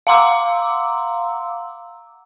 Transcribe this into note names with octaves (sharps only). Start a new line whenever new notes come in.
F5 F#5 A#5 C6 D6 E6